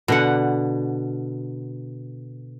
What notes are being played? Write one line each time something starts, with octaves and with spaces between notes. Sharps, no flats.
B2 D3 F#5